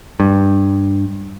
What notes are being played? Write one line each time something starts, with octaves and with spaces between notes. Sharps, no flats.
G2